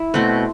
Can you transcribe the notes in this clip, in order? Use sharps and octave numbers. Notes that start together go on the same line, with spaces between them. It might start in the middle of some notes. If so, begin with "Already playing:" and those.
Already playing: E4
B2 A3 C4 F#4